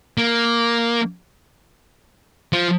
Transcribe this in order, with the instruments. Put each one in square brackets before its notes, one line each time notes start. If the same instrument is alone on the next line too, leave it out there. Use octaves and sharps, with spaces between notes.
[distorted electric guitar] A#3
F3